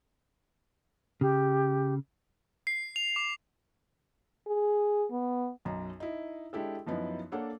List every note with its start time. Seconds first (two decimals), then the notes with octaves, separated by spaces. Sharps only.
1.21 C#3 G4
2.67 C7
2.96 F7
3.16 D6
4.47 G#4
5.12 B3
5.65 B1 F#2 A#5
6.00 D#4 E4
6.53 G#3 D4 E4 G4 A4
6.87 F#2 F3 B3 D#4 E4
7.32 A#3 D4 A4 C#5 F#5